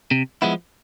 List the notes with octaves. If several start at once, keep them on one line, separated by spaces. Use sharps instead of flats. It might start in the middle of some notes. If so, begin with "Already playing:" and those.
C3
F3 G#3 B3 E4